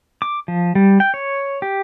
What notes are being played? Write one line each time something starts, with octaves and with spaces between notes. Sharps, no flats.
D6
F3
G3
G5
C#5
G4